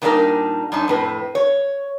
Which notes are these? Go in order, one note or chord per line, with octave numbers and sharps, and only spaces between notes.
A#2 D#3 G3 D4 D#4 A#4
F#2 D4 D#4
F2 A2 B4
C#5